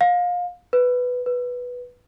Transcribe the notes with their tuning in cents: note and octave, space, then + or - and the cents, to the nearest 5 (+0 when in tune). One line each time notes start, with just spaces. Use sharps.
F5 +25
B4 +5
B4 -5